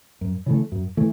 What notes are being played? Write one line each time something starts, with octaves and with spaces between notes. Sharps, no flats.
F#2
C#3 E3 A3
F#2
E3 A3